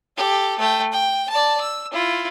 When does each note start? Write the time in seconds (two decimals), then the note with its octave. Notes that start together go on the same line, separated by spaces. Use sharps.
0.17 G4 A4
0.59 A3 G5
0.93 G5
1.30 D5 A5
1.60 E6
1.92 E4 F4